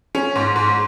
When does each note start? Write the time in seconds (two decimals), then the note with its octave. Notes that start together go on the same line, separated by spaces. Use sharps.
0.15 C#4
0.36 G#2
0.56 G#2